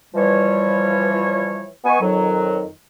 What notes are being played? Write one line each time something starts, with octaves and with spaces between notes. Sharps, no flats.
E3 F3 G3 C#5
B3 D#5 G#5 C#6
F2 D#3 F#3